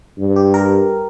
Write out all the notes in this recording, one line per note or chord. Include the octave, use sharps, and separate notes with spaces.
G2
G4
A#4